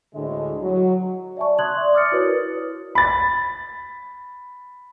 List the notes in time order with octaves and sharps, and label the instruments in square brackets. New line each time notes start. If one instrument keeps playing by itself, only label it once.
[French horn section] D2 A2 D3 G#3 D#5
F#3
[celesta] D5 E5 G#5 A5 C#6
C6 D#6 F#6 G#6 F#7
D5 E5 C6
D6 D#6 F6 A6 C#7
E4 F#4 A#4 B4 C#5
[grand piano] B5 A6